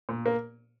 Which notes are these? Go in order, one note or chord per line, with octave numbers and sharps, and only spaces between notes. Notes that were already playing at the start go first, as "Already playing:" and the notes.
A#2
A#3